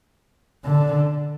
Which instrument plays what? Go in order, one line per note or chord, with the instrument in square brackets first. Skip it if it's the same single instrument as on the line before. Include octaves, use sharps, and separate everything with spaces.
[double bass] D3